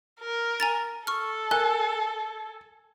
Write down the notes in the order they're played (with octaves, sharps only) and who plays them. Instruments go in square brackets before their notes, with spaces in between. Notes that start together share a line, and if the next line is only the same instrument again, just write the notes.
[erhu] A#4
[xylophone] G#5 A#5 A6
[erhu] A4 [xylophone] C#6 F6
[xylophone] A#4 F#6 [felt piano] G#5